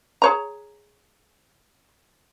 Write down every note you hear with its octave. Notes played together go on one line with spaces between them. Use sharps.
G#4 C#5 A#5